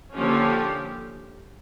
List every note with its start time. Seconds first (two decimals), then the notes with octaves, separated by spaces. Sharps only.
0.14 D3 F3 A#3 C#4 G4